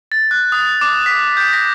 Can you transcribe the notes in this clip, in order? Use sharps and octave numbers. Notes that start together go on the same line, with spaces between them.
A6
F#6
D#6
D6
B6
G6
A#6